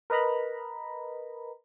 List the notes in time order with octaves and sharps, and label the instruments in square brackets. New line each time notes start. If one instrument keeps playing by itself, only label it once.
[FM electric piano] A#4 B4 D#5 A#5 B5